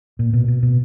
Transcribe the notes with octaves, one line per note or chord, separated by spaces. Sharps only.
A#2
B2
B2
B2